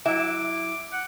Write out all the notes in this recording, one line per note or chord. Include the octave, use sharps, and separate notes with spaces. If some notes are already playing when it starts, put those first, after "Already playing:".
F#3 E4 E5 D6
F#5